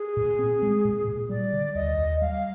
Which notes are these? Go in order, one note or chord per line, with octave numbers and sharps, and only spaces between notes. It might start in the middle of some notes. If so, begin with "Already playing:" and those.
Already playing: G#4
A#2
C4
G#3
A#2
A#2
G3 D5
D3
D#2 D#5
D#2
G3 F5